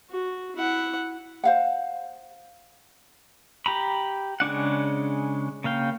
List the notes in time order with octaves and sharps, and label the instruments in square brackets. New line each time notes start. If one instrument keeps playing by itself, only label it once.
[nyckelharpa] F#4
E4 F#5
[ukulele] C5 F5 F#5
[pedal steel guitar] G4 A#5 B5
C#3 G#3 D4 F#5
C#3 A#3 F5 G5